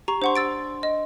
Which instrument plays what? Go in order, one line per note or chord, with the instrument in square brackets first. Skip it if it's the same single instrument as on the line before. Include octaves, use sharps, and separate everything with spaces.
[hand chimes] G4 [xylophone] A#5 C#6
[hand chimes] D4 C6 [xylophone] C5 F#5 C#6
[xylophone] E6 A6 D7
D#5